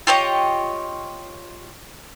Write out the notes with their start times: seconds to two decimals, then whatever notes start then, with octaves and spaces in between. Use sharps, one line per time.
0.07 F4 G4 C#5 D#5